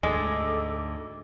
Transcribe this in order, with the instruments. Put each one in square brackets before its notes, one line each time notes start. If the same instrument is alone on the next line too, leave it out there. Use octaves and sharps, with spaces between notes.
[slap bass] D2 G#2 [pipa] G#3 [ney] A4 [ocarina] D6